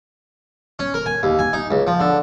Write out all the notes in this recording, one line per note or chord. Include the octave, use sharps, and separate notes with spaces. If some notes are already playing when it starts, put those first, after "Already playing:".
C#4
A#4
G#5
D#2
G#5
D#4
C#2
F3
D3